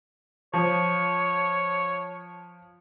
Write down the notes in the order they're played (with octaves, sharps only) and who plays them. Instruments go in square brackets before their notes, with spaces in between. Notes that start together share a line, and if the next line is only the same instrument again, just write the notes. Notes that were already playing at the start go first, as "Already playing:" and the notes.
[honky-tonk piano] F3 [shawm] C#5